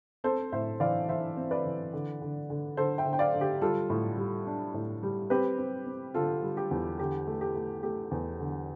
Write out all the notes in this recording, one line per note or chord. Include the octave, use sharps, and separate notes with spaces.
C4 A4 C5
A2 C5 E5
E3 D5 F5
E3 C5 E5
C4
B4 D5
E3
D3
D3
D3
D3 A4 C5
E5 G5
D3
G5
D5 F5
D3
G4
G3 F4 A4
A2
G3
D4
A2
G3
C4 G4 B4
C4
C4
D3 F4 A4
G3
G4
E2
D3 G4
A3
G4
A3
A3 G4
E2
D3